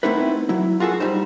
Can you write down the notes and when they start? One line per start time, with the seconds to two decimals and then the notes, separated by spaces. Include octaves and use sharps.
0.03 A3 B3 C4 D#4 E4 B4
0.49 F#3 E4
0.80 F4 F#4 G#4 A4
1.00 G3 D#4 C5